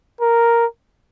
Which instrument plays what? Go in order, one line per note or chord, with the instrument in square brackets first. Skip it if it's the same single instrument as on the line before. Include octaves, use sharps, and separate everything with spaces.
[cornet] A#4